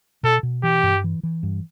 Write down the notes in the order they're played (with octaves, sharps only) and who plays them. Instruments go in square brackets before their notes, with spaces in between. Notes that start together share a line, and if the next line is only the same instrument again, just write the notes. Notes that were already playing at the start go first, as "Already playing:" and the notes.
[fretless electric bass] B2 [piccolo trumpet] A4
[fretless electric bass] B2
[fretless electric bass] E3 [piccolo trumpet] G4
[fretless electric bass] G2
E3
E3
G2